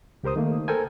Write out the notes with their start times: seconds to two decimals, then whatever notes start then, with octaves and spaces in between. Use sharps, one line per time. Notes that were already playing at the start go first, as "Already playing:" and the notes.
0.23 C#2 G4 A#4 C5 D#6
0.36 D#3 A3 A#3
0.68 A4 A#4 C5 G5 G#5